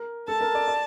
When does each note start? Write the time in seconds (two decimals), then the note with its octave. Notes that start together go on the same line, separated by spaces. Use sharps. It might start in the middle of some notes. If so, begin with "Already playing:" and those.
Already playing: A#4
0.28 A4 A5
0.41 A#4
0.55 D5
0.68 D5